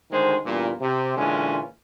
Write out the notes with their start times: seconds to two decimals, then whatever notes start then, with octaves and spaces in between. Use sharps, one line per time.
0.11 D2 D#3 G#3 C5
0.45 E2 G2 A#2
0.80 C3
1.16 A#2 D3 E3 G#3 C#4